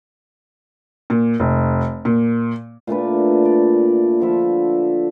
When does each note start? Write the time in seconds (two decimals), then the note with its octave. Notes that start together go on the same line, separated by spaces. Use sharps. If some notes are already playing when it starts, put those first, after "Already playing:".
1.10 A#2
1.40 F1
2.05 A#2
2.87 A#2 A3 D4 B4
3.45 D5
4.20 D3 F3 E5 B5